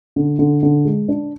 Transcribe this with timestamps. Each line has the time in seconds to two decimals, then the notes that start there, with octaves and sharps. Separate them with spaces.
0.16 D3
0.39 D3
0.63 D3
0.85 G#3
1.08 D4